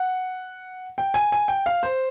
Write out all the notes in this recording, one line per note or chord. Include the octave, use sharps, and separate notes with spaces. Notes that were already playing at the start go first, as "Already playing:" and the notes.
Already playing: F#5
G5
G#5
G#5
G5
F5
C5